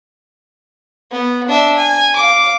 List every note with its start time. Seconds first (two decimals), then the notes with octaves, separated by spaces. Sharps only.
1.12 B3
1.48 D4 E5
1.77 G#5
2.16 F5 D6